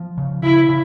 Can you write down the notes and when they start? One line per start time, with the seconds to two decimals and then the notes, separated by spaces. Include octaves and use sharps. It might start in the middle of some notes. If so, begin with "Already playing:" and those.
Already playing: F3
0.18 C#3
0.43 C#3 E4
0.69 C#3